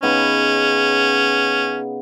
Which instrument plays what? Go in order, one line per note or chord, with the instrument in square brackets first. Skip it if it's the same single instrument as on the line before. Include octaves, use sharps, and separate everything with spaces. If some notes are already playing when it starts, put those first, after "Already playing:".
[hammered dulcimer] C#3 B3 D#4 [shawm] C#4